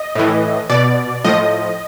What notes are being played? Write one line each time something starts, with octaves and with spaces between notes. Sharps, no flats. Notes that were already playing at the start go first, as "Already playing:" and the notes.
Already playing: D#5
A2 E3
B2 D5
A2 F3 D#5